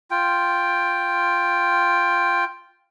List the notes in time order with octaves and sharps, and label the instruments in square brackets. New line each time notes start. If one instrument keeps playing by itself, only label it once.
[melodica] F4 G5